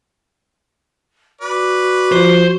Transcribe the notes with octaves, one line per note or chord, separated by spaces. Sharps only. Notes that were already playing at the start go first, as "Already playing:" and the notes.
F#4 B4 D5
F3 C5